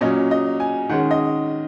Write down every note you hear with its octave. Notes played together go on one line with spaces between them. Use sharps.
A#2 F#3 C#4 D#5
D#5
G#5
D#3 G#3 C#4 F#5
D#5